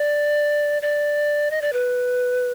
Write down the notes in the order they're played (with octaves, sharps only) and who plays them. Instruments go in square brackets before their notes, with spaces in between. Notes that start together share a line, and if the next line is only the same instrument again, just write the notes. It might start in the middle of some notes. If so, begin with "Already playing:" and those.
Already playing: [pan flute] D5
D5
D#5
D5
B4